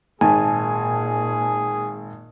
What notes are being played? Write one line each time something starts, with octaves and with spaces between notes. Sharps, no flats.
G#1 A#2 G#4 G#5 A5